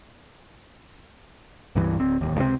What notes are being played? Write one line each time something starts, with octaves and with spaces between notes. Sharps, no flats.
C#2 G2 E3
D1 C4
D1 G1 D#2
C#2 C3 A#3 C4